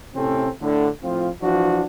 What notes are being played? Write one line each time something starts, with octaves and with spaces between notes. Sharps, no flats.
A2 C3 C4 C#4 A4
A2 D3
A2 F3 C4 F4
E3 F3 D4 F#4